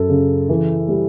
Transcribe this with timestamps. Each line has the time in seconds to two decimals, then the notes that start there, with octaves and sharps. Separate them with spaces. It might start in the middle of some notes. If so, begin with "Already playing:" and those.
Already playing: F#2 A4
0.09 C#3
0.49 E3
0.88 G3